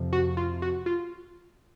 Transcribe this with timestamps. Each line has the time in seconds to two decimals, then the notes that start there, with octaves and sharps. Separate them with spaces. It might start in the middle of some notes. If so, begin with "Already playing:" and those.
Already playing: F2 C3 F3
0.13 F#4
0.37 F4
0.62 F#4
0.86 F4